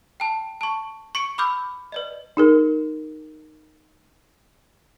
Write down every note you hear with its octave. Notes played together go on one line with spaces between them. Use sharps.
G5 A5
A5 C#6
C#6 C#7 D7
B5 D6 E6 F6 G6
B4 D5 D#5
D#4 G#4 A#4